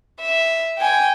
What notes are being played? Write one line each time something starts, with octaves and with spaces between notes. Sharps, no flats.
E5
G5 G#5